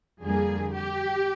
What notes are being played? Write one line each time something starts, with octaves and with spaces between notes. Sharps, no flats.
F2 D3 G3 A#3 G#4
G4